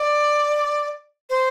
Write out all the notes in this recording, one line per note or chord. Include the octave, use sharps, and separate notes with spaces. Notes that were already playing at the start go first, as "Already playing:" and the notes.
Already playing: D5
C5